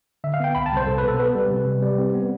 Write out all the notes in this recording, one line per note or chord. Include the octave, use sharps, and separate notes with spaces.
D3 E5
F5
B3 G5
C2 B5
A5
C2
C5
B2 A4
B4
B3 A4
B3 B4
G3
C3
G3
G3
C4
B3